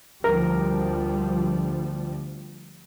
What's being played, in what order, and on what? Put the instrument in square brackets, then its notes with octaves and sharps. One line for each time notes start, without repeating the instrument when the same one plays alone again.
[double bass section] D2 F3 G3 [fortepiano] A#4